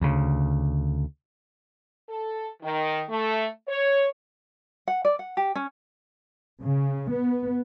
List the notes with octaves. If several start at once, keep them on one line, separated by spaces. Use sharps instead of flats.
D2 C#3
A4
D#3
A3
C#5
F#5
D5
F#5
G4
C#4
C#3
B3